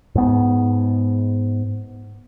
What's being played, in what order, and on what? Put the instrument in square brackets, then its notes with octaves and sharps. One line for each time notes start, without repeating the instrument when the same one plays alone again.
[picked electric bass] G#2 B3